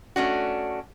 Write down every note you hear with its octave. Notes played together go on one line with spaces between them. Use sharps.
A3 C#4 D4 F#4